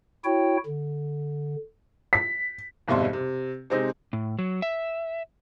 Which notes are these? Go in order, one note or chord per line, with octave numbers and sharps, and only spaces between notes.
E4 F#4 C#5 G5
D3
B6
G#1 F2 B2 G3 E5 C6
C3
C3 G#3 C4 D#4
A2
F#3
E5